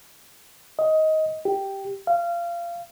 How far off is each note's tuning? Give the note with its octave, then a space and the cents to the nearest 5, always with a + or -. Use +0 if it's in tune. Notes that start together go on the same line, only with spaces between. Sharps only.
D#5 +15
G4 -5
F5 -25